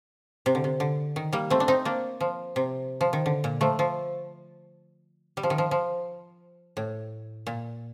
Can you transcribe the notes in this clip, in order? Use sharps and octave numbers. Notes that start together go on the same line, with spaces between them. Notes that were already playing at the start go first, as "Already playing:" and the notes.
C3
D3
C3
D3
D#3
G3 A#3
A3 C4
D4
C4 D#4
A#3 D4
F3
C3
F3
D#3
D3
A#2
F3 A3
F3
G3
F3
D#3
F3
F3
A2
A#2